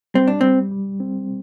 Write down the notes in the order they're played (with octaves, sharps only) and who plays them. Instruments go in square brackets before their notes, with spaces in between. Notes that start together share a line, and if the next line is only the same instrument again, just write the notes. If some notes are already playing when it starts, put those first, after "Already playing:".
[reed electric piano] G3 [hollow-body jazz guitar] C4
[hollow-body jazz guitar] D4
[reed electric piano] G3 [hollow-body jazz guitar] C4
[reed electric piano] G3
C4